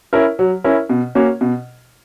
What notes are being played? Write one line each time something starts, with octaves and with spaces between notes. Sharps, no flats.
C#4 E4 A#4
F#3
C#4 E4 A#4
B2
A#3 C#4 F#4 C#5
B2